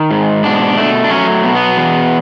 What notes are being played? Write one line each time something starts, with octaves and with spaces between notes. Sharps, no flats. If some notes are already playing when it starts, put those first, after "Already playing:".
Already playing: D#3
G#2
B2 D4
A3
D4
F#3 C#4
B2
B3
E2